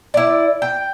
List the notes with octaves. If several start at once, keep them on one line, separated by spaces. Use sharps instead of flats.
E4 D5
G5